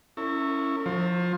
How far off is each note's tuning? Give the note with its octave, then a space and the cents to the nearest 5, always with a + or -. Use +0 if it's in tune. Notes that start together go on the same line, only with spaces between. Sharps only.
C#4 +0 E4 +0 A#4 -45
F3 +20 C5 +25